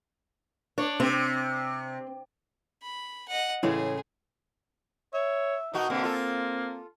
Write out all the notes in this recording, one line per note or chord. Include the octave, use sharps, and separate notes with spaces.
D4 C#5
C3 C4
B5
D#5 F#5
A2 C#3 E3 G#3 G#4
C#5 E5
B2 A#3 D#4 F#4
B2 D3 G#3 A#3 C4
F4 A4